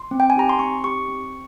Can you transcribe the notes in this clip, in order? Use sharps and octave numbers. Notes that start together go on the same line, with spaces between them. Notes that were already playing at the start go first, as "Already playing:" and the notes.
Already playing: C6
C4
G5
G#5
D#4 G4 A#5
C6
C4 C#6
D#4 G4 C#6
C4